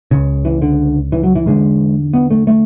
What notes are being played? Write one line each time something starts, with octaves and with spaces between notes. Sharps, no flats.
C#2 C#3
E3
D3
E3
F#3
E3
E2 D3 G#3
B3
A3
A3